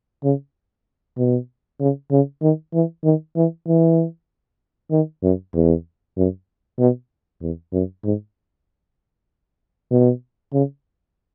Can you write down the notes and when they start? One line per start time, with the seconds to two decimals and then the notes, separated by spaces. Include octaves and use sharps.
0.23 C#3
1.17 B2
1.80 C#3
2.11 C#3
2.41 D#3
2.74 E3
3.04 D#3
3.36 E3
3.67 E3
4.91 D#3
5.23 F#2
5.54 E2
6.17 F#2
6.79 B2
7.41 E2
7.73 F#2
8.04 G#2
9.91 B2
10.53 C#3